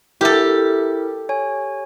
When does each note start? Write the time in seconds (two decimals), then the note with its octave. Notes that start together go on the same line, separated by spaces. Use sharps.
0.21 E4 G4 A4 A#4 E5
1.29 C#5 G#5